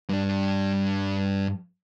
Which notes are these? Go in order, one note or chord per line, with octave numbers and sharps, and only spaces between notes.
G2 D4